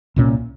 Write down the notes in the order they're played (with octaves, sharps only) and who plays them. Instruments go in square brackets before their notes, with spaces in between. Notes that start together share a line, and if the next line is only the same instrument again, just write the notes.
[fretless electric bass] C2 A#2 G#3 C#4